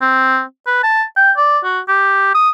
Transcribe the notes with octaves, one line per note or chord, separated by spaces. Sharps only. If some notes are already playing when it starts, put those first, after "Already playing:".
C4
B4
A5
G5
D5
F#4
G4
D#6